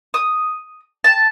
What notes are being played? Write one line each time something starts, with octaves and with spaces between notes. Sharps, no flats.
D#6
A5